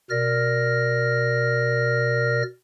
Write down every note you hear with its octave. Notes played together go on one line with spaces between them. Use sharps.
B2 A#4 D5 F6 A#6